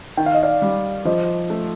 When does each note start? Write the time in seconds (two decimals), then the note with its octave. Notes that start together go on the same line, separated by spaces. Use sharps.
0.17 D#3 G5
0.26 F5
0.34 D#5
0.43 D5 F5
0.62 G3
1.05 F3 C5 D#5
1.50 A3